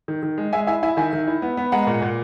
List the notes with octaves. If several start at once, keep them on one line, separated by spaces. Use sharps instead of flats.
D#3
D#3
G#3
G#3 E5 G#5
E4 E5 G#5
E4 E5 G#5
D#3 E5 G#5
D#3
E4
B3
B3
G#3 F#5 A#5
A#2
A#2